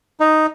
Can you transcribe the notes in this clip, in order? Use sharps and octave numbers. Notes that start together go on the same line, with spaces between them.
D#4